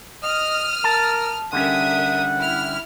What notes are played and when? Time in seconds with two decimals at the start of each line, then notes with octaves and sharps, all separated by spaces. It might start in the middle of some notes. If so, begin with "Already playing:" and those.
0.23 D#5 D#6 F6
0.84 A#4 A5
1.53 D3 G3 C#4 A#4 E5 F#5 D#6
2.39 E4 F6